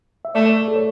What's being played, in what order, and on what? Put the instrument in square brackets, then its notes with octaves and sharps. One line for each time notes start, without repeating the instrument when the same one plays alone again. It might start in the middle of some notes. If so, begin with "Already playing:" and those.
[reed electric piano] E5
[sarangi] A3 [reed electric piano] D5
[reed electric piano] D5
A4
C#5